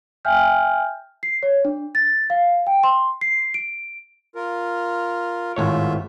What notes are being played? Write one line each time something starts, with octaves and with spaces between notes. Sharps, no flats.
E5 G5 G#5 F6 G6
C7
C#5
D4
A6
F5
G5
C6
C7
D7
F4 A#4
G#1 A2 F4 C#5 E5